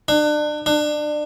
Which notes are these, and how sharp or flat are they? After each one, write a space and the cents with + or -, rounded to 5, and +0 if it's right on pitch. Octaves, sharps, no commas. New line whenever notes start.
D4 +35
D4 +30